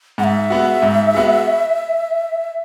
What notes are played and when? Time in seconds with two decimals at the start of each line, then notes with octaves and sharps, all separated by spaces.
0.18 G#2 F#5
0.24 E5
0.50 G#3 B3 F#4
0.82 G#2
1.14 G#3 B3 F#4